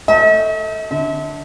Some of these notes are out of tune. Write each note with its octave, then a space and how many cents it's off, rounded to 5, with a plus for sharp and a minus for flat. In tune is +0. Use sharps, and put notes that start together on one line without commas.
A3 +15 D#5 +45
D3 +0 E5 -40